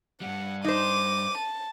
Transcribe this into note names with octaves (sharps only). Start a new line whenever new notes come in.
G2 G3 F#5
D#4 C5 D6 D#7
A5